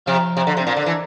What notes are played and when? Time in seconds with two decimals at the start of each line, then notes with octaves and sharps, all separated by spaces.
0.06 C3 F3 F4
0.37 C3
0.47 D3
0.57 C3 C4
0.67 A#2 D4
0.77 D3
0.81 E3 D4